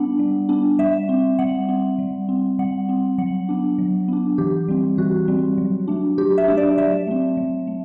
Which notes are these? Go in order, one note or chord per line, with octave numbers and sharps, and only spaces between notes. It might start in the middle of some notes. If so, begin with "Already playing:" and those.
Already playing: G3 B3 D4 F#5
G3
B3 D4
G3 E5
C4
G3 F#5
C4
G3
C4
G3 F#5
C4
F#3 F#5
B3 D4
F#3
B3 D4
E3 G4
G3 C4
E3 F#4
G3 C4
F#3
A3 D4
F#3 G4
E5
A3 D4
D5
F#3 E5
A3 C4
F#3
A3